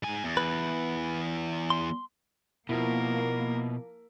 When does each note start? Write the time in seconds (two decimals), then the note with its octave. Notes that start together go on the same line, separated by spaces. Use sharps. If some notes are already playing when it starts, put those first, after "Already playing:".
0.03 G#2 G#5
0.24 E2
0.37 B4
1.70 C6
2.69 B2 F3 A#3 E4 A#4